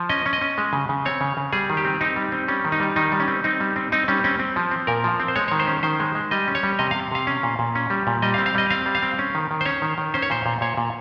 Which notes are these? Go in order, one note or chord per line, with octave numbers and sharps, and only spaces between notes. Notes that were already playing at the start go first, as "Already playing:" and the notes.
Already playing: F3
C#4 D#5
C#4
D#5
C#4
G#3
C#3
C#3
C4 C#5
C#3
C#3
G3 G#4
D#3
G4
C4
C4 D#4
G3
C4
G3 C#4
D#3
D#4
G3
D#3 D#4
G3
C#4
C4
C4 D#4
G3
C4
C4 D#4
G3 C#4
C4 C#4
C4
F3
C4
A#2 A#4
F3
C4
C5
G#3 C#5
D#3 C#5
C5
C#4
D#3 C5
G#3
G#3
G3 D#5
C#4
C#5
G3
C3 D#5
F5
C3
C3 F5
C#4
A#2
A#2
C#4
G3
A#2
G3 D#5
F5
C4
F5
G3 D#5
C4 F5
G3
F5
C4
C#4
D#3
D#3
C5
C#4 C#5
D#3
D#3
C#4 C5
C#5
A#2 C5
A#2
A#2 C#5
A#2